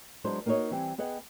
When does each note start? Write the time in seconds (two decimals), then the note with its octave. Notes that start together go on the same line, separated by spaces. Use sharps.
0.24 F#3 G#3 B3 D4 E4 C5
0.46 A#3 D#4 F#4 G#4 C#5 D#5
0.71 E3 G3 C4 G4 G5 G#5
0.98 B3 G#4 D#5 F#5 G5